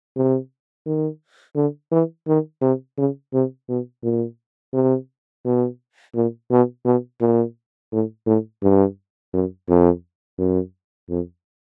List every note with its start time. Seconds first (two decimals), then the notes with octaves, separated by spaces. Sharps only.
0.16 C3
0.86 D#3
1.56 D3
1.92 E3
2.28 D#3
2.62 C3
2.98 C#3
3.33 C3
3.69 B2
4.03 A#2
4.73 C3
5.45 B2
6.15 A#2
6.51 B2
6.85 B2
7.21 A#2
7.92 A2
8.27 A2
8.63 G2
9.34 F#2
9.69 F2
10.38 F#2
11.09 F2